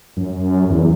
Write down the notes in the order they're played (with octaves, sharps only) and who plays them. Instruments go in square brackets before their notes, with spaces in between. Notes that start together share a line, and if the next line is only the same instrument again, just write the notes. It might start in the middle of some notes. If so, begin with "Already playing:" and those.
[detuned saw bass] F#2
E2